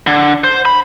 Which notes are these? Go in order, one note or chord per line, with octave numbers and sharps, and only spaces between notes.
D3
C5
B5